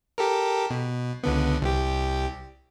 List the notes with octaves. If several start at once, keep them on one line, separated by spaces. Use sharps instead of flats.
G4 A4 A#4
B2
C#2 D3 B3
C2 G4